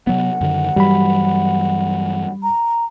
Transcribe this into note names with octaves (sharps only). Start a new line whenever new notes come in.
C3 F#3 B3 F#5
F#2 D3 D#3
G2 E3 F#3 G3 B5
A#5